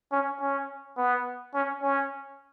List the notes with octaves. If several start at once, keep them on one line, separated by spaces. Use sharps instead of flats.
C#4
C#4
B3
C#4
C#4